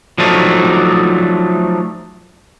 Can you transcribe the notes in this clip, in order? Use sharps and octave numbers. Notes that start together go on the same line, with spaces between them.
F3 F#3 A3 D4 D#4